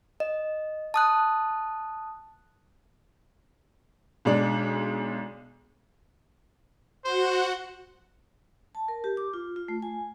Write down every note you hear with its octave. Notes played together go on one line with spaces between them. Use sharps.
D#5
A5 D#6 F#6
B1 G#3 D4
F#4 C5 F#5
A5
A#4
G4
D6
F4
F4
A3
G#5